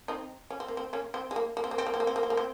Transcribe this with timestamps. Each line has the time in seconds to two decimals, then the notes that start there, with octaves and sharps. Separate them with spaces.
0.08 C4 D#4
0.50 C#4
0.60 C4
0.68 A#3
0.77 C4
0.93 A#3 C#4
1.14 C4
1.31 G#3
1.36 A#3
1.57 A#3
1.64 C4
1.71 A#3
1.78 C4
1.86 A#3
1.94 C4
2.00 A#3
2.07 C4
2.16 A#3
2.23 C4
2.30 A#3
2.37 C4